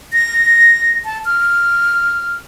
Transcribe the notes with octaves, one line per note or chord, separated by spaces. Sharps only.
A#6
A5
F6